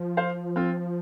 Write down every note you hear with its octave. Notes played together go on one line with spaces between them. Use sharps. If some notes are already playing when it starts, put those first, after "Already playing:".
Already playing: F3
C5 F5
C4 F4